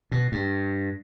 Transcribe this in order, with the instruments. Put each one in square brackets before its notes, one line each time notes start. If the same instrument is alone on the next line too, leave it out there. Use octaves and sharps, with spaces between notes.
[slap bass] B2
G2